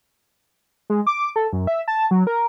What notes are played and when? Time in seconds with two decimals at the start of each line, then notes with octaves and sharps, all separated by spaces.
0.90 G#3
1.07 D6
1.36 A4
1.53 F#2
1.67 E5
1.88 A5
2.11 F#3
2.27 A#4